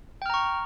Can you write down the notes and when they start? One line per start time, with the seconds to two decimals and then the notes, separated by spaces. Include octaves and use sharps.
0.22 G5
0.26 F6
0.30 A#5
0.34 C#6